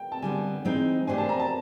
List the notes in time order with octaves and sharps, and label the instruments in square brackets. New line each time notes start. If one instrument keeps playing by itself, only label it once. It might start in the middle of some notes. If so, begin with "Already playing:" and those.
Already playing: [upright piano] G5
A5
[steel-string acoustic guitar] D3 G3 B3 [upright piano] G#5
[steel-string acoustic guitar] E3 G#3 C4 D#4
[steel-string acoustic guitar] A3 D4 G4 C5 [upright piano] G#5
[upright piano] A5
A#5
A5